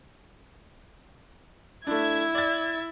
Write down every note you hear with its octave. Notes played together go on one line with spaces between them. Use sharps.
A3 D4 E4 E5 G#6
D5 A6